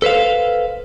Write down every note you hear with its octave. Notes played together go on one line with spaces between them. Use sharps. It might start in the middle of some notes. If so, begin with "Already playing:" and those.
A4 B4 C5 F5